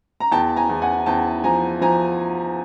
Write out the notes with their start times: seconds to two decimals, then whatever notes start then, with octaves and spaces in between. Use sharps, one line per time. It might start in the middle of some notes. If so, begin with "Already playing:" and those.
0.20 A#5
0.32 E2 G5 A5
0.56 G#5 A#5
0.69 E2
0.82 F#5 G#5
1.06 E2 G5 A5
1.44 F3 G#5 A#5
1.81 F3 G#5 A#5